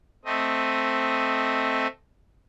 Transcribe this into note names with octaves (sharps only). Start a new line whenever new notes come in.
A3 C4 D#5